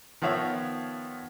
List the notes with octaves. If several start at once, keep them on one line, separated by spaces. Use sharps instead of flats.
D#3 F3 B3 C#5 E5